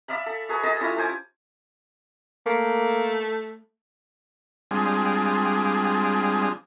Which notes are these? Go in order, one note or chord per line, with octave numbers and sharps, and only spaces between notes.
D5 E5 F5 B5
A4
F#4 G#4 A4 B4
A4 D#5 A5 B5
G3 C#4 E4 F4
A4 C5 G#5 D6
A3 A#3
G3 G#3 C4 D4 F4 G#4